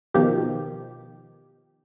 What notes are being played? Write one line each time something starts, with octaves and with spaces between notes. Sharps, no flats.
B2 D#3 F3 G4